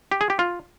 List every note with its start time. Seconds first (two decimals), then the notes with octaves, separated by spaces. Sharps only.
0.12 G4
0.21 G#4
0.30 G4
0.39 F4